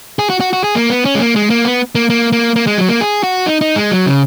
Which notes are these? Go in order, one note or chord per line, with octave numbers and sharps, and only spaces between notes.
G#4
F#4
F#4
F#4
G#4
A#3
B3
C#4
G#3
A#3
G#3
A#3
B3
A#3
A#3
A#3
A#3
G#3
F#3
A#3
G#4
F#4
D#4
D#4
G#3
F#3
C#3